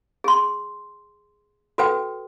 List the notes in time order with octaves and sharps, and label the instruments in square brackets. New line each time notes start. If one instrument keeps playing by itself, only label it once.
[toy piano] G#4 C6
F#4 A4 B4 G5